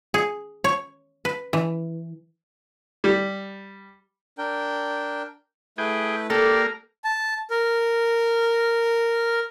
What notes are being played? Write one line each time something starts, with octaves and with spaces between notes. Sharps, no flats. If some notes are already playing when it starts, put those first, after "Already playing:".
G#4
C#5
B4
E3
G3
D4 A#4 G5
A3 E4 G#4 B4 G5
A#3 G4 A4 A#4 D5
A5
A#4